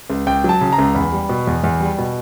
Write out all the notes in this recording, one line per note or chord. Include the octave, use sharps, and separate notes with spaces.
C#2
C#2 G5
F#3 A5
C#3
A#5
C#2
E2 B5
G3
B2
E2
E2
G3
B2